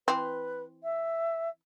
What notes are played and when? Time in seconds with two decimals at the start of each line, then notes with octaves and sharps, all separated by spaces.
0.08 E3 C4 B4
0.83 E5